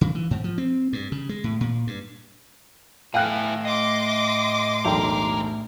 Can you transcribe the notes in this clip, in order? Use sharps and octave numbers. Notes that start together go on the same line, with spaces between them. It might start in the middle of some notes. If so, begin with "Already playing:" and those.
C#3
E3
G#2
F3
C4
G2
C#3
G#3
A2
A#2
G2
A2 E4 G#4 F5 G5 F#6
D#5 C6 D6
E1 B1 A3 A#4 G5